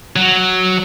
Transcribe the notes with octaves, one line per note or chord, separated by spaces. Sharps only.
F#3